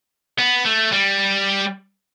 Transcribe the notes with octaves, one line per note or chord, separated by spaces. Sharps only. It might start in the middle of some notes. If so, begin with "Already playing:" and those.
B3
A3
G3